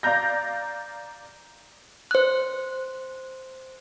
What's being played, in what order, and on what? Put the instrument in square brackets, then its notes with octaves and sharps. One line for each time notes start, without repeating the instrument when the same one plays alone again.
[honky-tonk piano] D5 F5 A#5 G6 A#6
[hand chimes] C5 F#6